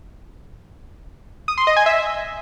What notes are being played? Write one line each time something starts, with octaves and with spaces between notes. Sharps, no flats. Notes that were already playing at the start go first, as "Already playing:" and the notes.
D#6
C6
D#5
G#5
E5